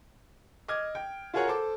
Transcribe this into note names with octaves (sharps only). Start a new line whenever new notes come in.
D#5 D6 F6 G#6
G5
F4 F#4 G#4 A#4 C#5 F#5
A4 C5 D6